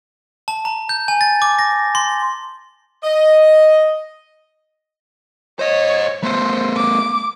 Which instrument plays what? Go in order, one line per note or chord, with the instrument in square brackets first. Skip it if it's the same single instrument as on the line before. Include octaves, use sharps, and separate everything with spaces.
[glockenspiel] A5
A#5
G6
G#5
A6
D6
A#6
C6
[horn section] D#5
[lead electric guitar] C5 D#5 [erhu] C#5
[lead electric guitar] A3 B3 [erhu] C5
[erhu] D6